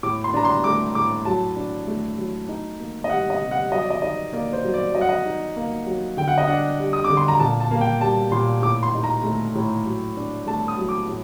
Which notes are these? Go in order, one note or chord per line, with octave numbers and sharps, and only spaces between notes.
A2 D6
C6
D4 A#5
C6
A3 D6
A2 D6
F#3 A5
D4
A3
F#3
D#4
A#3
D#5
G3 F#5
D#5
C3
F#5
F#3 D#5
D5
D#5
D#4 D#5
A#3 D5
C5
F#3
D5
F#3 D#5
F#5
D#5
D#4
A#3
F#3
D3 G5
F#5
D#5
D4 F#5
G3
D#6
D3 D6
C6
A#5
A#2 A5
A5
A#3
G5
G3 A5
A#2 C6
A2 D6
C6
D#4
A#5
A3
A2
F#3
D4
A3 A5
D#6
F#3
D6
A2